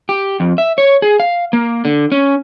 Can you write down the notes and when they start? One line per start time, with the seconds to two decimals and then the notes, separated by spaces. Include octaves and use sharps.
0.09 G4
0.40 F2
0.58 E5
0.78 C#5
1.02 G#4
1.20 F5
1.53 A#3
1.85 D3
2.12 C#4